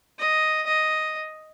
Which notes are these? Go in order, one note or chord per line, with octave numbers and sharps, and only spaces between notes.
D#5
D#5